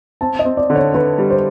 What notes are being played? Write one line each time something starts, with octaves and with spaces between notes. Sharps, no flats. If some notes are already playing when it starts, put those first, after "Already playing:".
C4 A5
D#5
C4
D5
D3
C#5
D3 B4
G3
C5